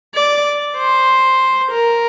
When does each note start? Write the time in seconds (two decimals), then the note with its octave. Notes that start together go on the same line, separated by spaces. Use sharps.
0.15 D5
0.77 C5
1.71 A#4